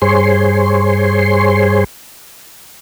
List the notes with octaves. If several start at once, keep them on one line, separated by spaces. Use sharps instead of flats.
G2 G#4 C5 C#5 C6